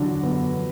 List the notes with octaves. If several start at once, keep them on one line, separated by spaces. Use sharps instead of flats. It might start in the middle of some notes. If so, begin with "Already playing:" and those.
Already playing: F#2 D3 F#3 D4 F#4
F#2 B3
F3